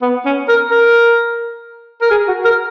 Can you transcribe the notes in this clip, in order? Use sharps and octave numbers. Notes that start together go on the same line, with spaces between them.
B3
C#4
A#4
A#4
A#4
G#4
F#4
A#4